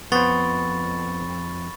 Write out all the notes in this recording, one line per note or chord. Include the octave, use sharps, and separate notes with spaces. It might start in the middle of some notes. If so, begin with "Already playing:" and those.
F2 B3 C5 B5 C#6 A6